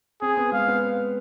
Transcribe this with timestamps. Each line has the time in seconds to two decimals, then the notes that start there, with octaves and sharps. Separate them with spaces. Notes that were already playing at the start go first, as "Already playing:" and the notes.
0.21 C4 G#4
0.37 B3
0.52 G#3 F5
0.68 B3